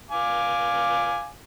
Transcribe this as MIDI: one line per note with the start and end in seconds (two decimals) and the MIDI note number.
0.11 1.29 77
0.11 1.29 80
0.11 1.29 86